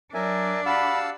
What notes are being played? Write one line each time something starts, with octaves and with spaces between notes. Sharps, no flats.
F#3 D4 A#4 E5 G#5
F#4 G4 F5 F#5 A5 B5 E6